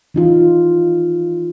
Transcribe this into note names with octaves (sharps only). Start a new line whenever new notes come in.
E3 D#4 F4